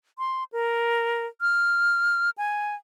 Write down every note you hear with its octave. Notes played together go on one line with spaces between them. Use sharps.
C6
A#4
F6
G#5